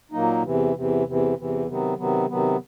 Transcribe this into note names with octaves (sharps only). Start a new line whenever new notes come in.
A#2 F#3 A#3 D#4
E2 C3 E3
E2 C3 E3
E2 C3 E3
E2 C3 E3
C3 D#3 F#3 B3
C3 D#3 F#3 B3
C3 D#3 F#3 B3